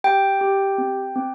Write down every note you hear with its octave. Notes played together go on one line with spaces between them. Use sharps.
G4 G5
G4
C4
C4